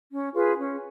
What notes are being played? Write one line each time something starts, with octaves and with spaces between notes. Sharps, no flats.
C#4
F4 G#4 B4
C#4